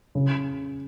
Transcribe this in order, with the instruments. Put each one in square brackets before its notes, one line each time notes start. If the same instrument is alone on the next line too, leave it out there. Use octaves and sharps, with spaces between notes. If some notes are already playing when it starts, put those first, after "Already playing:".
[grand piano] C#3